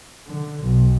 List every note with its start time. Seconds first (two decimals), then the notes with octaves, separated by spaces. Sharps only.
0.25 D3
0.61 B1